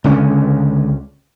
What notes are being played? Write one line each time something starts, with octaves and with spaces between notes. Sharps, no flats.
C#2 D3 C#4